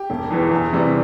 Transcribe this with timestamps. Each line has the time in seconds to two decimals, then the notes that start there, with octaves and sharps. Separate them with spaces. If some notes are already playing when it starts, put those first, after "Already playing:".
Already playing: G4
0.10 E1
0.31 E2 E3
0.51 E2
0.73 C3 E3 G3